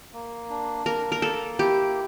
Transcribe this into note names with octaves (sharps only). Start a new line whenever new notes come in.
A#3
D4
A#3 A#4
A#4
A#3 A4
E4 G4